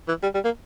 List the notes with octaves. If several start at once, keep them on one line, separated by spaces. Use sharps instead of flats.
E3
G3
G3
A#3